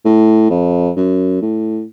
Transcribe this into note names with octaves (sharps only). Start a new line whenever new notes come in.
A2
F2
F#2
A2